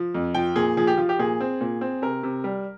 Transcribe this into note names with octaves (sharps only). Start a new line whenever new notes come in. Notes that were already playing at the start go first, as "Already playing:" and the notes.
Already playing: F3
F2
F3 G5
A#2 G#4
F3 G#4
G4
F3 F4
G4
A#2 G#4
C4
A#2
C4
C3 A#4
C3
G3